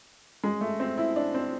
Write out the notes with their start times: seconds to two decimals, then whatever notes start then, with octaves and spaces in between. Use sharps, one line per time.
0.44 G#3
0.61 A3
0.80 C4
0.98 E4
1.16 D4
1.34 C4